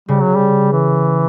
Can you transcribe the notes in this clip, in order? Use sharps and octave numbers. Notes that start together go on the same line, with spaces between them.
C#3 G3
F#3
G3
E3